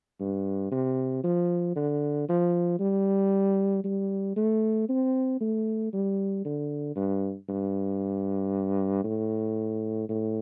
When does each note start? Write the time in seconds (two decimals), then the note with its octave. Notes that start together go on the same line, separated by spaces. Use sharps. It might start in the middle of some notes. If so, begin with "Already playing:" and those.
0.20 G2
0.71 C3
1.24 F3
1.76 D3
2.29 F3
2.80 G3
3.84 G3
4.36 A3
4.89 C4
5.41 A3
5.93 G3
6.45 D3
6.96 G2
7.49 G2
9.04 A2
10.09 A2